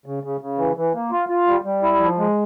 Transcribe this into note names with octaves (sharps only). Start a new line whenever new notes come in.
C#3
C#3
C#3
E3
E3
A#3
F4
F4
G3
G3
E4
F3
G#3